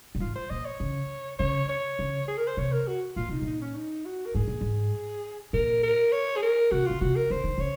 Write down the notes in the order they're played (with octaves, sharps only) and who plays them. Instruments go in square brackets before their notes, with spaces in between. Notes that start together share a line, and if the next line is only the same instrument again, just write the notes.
[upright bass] A#2
[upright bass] G#2 [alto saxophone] F4
[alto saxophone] C5
[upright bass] A#2 [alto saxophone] D#5
[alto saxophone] C#5
[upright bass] C#3
[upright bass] C#3 [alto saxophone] C#5
[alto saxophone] C#5
[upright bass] C#3
[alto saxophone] G#4
A#4
C5
[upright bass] C3 [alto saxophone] C#5
[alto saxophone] A#4
F#4
[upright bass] A#2 [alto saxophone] F4
[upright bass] C3 [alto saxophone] D#4
[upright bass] A#2 [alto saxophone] D#4
[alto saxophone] C#4
D#4
F#4
A#4
[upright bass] G#2 [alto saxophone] G#4
[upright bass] A#2
G#2
[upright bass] A#2 [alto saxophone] A#4
[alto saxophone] A#4
C#5
G#4
A#4
[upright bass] C3 [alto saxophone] F#4
[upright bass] C#3 [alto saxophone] F4
[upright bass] C3 [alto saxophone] F#4
[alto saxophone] A#4
[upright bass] C#3 [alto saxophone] C5
[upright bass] D#3
[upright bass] C#3 [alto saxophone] C#5